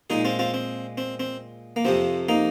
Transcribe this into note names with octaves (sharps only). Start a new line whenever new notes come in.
A#2 G#3 D#4 G#4
C4 F4
C4 F4
C4
C4
C4
A#3
F2 C3 F3 C4
A#3 D#4